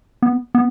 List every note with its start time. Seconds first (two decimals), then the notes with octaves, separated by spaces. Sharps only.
0.22 B3
0.55 B3